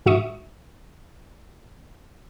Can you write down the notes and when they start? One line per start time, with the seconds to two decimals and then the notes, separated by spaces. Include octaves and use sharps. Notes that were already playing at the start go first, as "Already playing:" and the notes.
0.06 G#2 F#4 E5 C#6 D#6